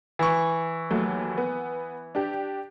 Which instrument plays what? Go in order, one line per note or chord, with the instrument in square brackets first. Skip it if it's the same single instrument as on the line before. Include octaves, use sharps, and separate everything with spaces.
[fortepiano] E3 C#6
[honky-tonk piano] D#2 F#3 A3
B3
D4 G4